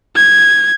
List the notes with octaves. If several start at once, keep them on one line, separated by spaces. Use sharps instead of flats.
G#6